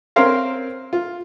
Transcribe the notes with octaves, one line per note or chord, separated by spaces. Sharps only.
C4 C#4 A#4 C5 F5 A#5
F4